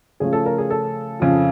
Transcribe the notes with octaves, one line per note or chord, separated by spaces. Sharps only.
C#3 F3 A3 C#4 G#4
A4
A#4
G#4
A4
F2 C#3 F3